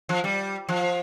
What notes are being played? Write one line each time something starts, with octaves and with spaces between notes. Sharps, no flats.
F3
G3
F3